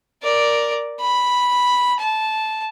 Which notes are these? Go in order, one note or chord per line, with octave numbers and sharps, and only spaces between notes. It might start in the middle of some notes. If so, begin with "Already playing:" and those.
A#4 D5
B5
A5